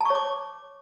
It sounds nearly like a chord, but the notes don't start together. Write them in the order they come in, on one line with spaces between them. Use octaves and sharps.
A5 C#6 C#5 D6